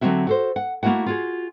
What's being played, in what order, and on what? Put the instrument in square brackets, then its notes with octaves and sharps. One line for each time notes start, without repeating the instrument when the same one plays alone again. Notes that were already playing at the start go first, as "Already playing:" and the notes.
[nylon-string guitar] D3 F#3 A3 C4 F#4 E5
F#4 A4 C5
F#5
A3 A#3 D#4 E4 F#4 F#5
F4 F#4 G#4